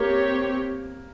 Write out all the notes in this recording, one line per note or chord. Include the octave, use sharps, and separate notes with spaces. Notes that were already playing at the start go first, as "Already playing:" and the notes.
Already playing: A#3 C4 G4 C#5